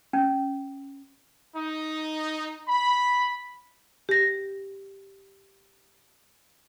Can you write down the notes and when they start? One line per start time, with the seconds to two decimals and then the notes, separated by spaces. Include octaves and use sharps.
0.13 C#4
1.56 D#4
2.68 B5
4.09 G4 A#6